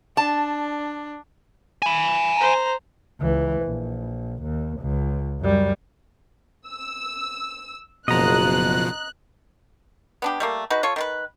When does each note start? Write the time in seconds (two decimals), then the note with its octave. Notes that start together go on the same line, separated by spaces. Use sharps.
0.17 D4 A5
1.82 G#5 B5
2.36 C5 A#5
3.20 C#2 E3
3.63 A#1
4.42 D#2
4.80 C#2
5.41 F#2 G3
6.67 E6
8.08 F#1 B2 F3 D#5 A#5 F#6
10.22 B3 D4 G4
10.40 G3 A3 A#3
10.70 D#4 F#4 G#4 B4
10.83 F4 A4 C#5
10.96 D#3 F4 B4